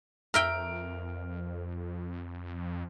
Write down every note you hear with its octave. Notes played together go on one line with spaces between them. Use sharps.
F2 A#4 E5 G5 F6 D7